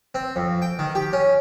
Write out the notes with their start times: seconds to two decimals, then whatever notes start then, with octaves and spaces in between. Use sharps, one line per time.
0.15 C4
0.36 F2
0.62 G5
0.79 D#3
0.95 G4
1.13 C#4